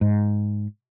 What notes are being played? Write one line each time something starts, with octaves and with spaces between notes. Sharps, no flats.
G#2